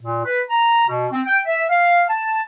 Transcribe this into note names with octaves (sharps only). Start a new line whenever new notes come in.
A#2
B4
A#5
B2
C4
G5
E5
F5
A5